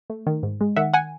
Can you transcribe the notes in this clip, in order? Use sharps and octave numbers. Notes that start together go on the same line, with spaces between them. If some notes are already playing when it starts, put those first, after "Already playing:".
A3
D#3
G#2
G#3
D#3 E5 F#5
F#5 G#5